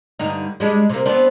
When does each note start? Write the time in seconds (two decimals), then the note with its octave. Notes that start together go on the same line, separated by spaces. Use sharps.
0.19 G2 D3 D#4
0.60 G3 G#3 D4
0.90 C3 A#3
1.06 B3 C4 D4